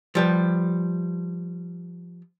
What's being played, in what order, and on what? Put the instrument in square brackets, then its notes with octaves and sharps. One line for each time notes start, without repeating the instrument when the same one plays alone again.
[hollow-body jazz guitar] F3 G3 B4